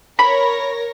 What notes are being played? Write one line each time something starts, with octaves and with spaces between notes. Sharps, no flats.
A#4 C#5 B5 A#6